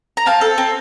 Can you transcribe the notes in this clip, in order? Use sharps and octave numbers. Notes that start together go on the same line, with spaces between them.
A#5
C4 F5 A5
A4
C4